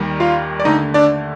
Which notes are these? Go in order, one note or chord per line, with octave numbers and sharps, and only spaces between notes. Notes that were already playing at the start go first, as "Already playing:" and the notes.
Already playing: D#2 D#3 G3
F4 F5
D5
D#2 D3 A3 D#4 D#5
D4 D5